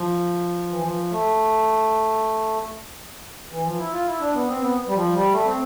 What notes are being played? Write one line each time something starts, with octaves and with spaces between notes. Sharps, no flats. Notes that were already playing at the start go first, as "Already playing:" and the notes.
Already playing: F3
E3
F3
A3
E3
F3
E4
F4
E4
D4
B3
C4
B3
G3
F3
G3
A3
C4